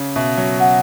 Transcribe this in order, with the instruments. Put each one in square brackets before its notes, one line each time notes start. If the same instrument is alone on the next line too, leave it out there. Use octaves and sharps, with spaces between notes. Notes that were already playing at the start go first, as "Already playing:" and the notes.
Already playing: [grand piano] C#3 [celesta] D6
[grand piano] B2 [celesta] E5
[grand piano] F#3
[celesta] F#5